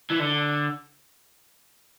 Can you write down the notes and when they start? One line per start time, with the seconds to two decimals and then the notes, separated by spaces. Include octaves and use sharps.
0.10 E3
0.19 D3